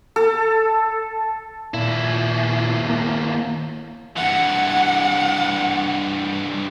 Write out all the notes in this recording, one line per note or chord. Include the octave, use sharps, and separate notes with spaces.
A4
D#2 A#2 E4
A#3
G2 E3 F#5